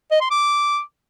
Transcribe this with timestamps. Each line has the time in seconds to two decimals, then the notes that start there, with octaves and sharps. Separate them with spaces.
0.11 D#5
0.21 C6
0.30 D6